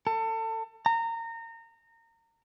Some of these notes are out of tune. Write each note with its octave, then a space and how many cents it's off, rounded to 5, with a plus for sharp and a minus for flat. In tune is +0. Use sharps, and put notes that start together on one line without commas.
A4 +30
A#5 -25